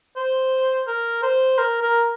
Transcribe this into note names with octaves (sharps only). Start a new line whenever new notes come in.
C5
A#4
C5
A#4
A#4